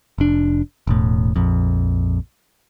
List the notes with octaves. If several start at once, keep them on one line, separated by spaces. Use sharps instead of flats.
F1 D4
E1 A2
A#1 F2